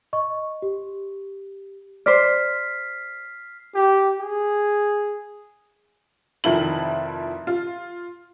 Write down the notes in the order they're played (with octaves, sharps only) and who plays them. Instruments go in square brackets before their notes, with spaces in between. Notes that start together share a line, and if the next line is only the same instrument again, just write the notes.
[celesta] D#5 C#6
G4
[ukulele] C5 D5 [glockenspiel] F6 B6 C7
[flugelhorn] G4
G#4
[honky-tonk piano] F1 D#3 F3 E4 F#7
F4